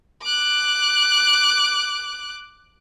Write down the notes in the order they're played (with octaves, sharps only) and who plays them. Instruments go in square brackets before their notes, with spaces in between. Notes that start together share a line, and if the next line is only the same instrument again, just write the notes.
[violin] D6 F#6